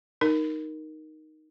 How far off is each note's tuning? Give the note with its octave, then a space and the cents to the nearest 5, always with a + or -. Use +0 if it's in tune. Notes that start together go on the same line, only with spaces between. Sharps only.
D#4 +0 A#4 +0